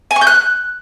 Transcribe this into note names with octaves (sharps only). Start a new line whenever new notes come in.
G#5
C#6
G6
F#6